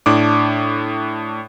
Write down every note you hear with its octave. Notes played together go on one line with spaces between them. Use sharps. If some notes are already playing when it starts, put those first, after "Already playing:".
A2 D4 D6